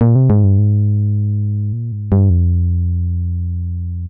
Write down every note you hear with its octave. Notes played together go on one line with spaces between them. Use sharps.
A#2
C3
G#2
G2
G#2
A#2
G#2
G2
F2